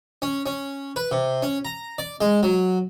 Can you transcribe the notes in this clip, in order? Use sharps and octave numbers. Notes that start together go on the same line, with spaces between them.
C#4
C#4
B4
C3
C#4
A#5
D5
G#3
F#3